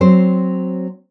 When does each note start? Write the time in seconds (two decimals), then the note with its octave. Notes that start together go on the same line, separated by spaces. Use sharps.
0.01 F#3 C4 C5